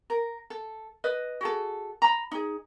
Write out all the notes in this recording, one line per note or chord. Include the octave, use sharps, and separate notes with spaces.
A#4
A4
B4 D#5
F#4 G#4 A4
A#5 B5
D#4 G#4